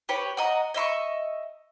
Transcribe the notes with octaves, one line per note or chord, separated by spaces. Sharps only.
G4 B4 C#5
F#4 D#5 A#5
D#5 E5 C6 C#6